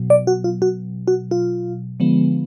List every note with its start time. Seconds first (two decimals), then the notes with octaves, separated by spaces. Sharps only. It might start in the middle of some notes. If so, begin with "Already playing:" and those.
Already playing: B2 F#3
0.10 D5
0.27 F#4
0.44 F4
0.62 F#4
1.08 F#4
1.31 F4
2.00 D3 F3 G#3 B3